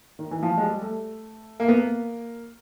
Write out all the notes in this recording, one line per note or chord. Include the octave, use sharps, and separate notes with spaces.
D#3
E3
F3
G#3
G3
A3
A#3
B3
A#3